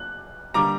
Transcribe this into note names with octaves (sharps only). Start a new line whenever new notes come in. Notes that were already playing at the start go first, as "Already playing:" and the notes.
Already playing: F#6
D3 G3 A#3 A#5 D6